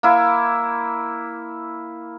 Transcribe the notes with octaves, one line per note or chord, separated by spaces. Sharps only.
A#3 E4